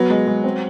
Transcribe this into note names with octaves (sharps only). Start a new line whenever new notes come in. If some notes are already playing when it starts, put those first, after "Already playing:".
Already playing: F#3 B3
G#3
G#3
C4